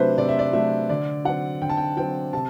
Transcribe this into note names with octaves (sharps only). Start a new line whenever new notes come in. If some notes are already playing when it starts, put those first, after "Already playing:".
Already playing: C3 F#3 A3 D4 B4 C5 E5
C3 D5
E5
D5
F#3 A3 D4 E5
D3 D5
F#3 C4 F#5
D3 G5
A5
G5
F#3 C4 G5
C3 A5